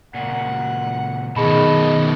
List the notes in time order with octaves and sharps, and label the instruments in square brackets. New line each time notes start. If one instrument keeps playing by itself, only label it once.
[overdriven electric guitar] A#2 C#3 [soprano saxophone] F#5
[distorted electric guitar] B2 D#3 [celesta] G#4 B5 [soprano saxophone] D#5 [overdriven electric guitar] A5